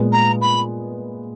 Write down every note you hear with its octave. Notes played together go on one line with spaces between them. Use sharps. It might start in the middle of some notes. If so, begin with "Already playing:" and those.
Already playing: A#2 G#3 B3
A#5
B5